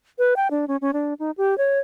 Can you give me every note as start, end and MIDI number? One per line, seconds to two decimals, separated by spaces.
0.18 0.34 71
0.36 0.48 79
0.51 0.65 62
0.68 0.77 61
0.81 0.91 61
0.93 1.14 62
1.20 1.31 63
1.37 1.57 67
1.58 1.79 73